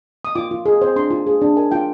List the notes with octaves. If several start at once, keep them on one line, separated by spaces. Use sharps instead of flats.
D#6
F4 D6
F4
G#4
C5
D4 C6
F4
G#4
D4
A#4 G#5
F4 G5